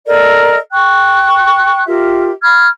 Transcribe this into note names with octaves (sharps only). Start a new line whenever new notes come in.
A4 A#4 D5 D#5
G5 C#6 F#6
F4 G4 A#4 E5
B5 F6 G#6